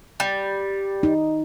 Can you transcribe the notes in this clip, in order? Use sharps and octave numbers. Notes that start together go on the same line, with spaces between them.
G3
D#4